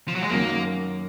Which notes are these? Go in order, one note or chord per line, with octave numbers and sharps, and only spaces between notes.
F3
F#3
G#3
F#2 D#3 F#3 A#3 C#4